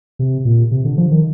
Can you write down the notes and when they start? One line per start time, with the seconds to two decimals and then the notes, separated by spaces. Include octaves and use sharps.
0.19 C3
0.45 A#2
0.71 C3
0.85 D3
0.97 F3
1.11 D#3